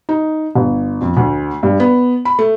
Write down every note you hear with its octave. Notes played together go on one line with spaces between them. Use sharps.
D#4
G1
F2
D2
G2
B3
B5
A3